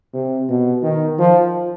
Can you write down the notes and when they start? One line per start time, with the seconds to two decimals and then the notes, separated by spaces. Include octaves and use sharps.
0.14 C3
0.49 B2
0.83 D#3
1.19 F3